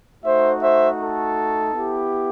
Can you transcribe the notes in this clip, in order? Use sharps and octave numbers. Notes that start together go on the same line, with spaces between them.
A3 D#4 F#4 C5 E5
C5 E5
A4
B3 E4 G4